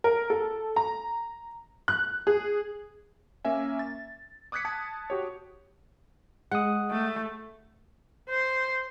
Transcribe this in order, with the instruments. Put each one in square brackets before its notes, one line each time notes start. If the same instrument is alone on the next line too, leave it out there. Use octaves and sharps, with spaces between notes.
[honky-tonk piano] A#4
A4
A#5
F#6
G#4
[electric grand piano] A#3 C#4 A#4 E5 G#5
A6
D6 D#6 F#6 G#6 B6 C#7
A5 G#6 B6 C#7
F#4 G4 C#5
[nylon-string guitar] G#3 [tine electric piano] F#5 D#6
[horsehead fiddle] A3
[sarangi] C5